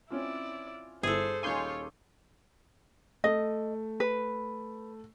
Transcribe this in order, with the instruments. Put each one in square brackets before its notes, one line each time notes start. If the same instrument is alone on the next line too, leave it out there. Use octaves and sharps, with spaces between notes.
[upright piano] C4 C#4 F4 [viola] E4 D5
[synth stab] G1 [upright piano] E4 [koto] G#4 A4 [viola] C5
[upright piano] D#1 D#4 D6 [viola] F4 C#5 [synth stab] G#5 C6 G6
[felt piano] A3 [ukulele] D#5
[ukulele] B4